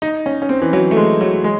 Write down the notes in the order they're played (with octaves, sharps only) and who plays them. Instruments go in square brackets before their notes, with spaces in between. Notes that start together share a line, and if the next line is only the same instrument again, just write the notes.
[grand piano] D#4
C#4
C#4
C4
E3
F#3
A3
G#3
F#3
G#3